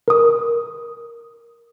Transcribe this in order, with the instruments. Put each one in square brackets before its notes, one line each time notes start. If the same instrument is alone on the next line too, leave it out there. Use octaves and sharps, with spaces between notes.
[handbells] A#4 D#6